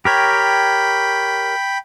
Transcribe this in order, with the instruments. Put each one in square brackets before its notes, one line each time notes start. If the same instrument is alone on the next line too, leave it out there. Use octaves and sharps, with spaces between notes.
[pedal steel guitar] G4 A#4 C#5 [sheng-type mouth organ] G5 B5